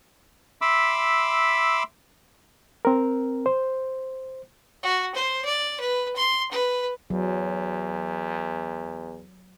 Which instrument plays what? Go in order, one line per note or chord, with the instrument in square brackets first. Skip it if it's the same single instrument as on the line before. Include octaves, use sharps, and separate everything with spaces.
[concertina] E5 B5 C6 D6 E6
[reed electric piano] C4 A#4
C5
[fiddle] F#4
C5
D5
B4
C6
B4
[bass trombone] E2 [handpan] F#3